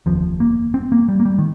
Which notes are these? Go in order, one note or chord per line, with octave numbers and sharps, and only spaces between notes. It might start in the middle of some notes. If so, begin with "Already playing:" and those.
F1 D#2 F3
A#3
C4
A#3
G3
A#3
G3
D#3